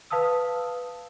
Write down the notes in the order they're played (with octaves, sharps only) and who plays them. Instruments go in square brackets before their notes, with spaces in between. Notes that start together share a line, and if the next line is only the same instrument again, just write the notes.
[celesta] B4 F5 A5 D#6 E6